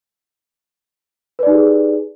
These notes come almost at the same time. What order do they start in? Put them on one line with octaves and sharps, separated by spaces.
B4 D5 D#4 G4 G#4